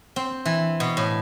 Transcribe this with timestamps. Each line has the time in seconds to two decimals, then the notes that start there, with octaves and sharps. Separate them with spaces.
0.16 C4
0.46 E3
0.80 B2
0.97 A2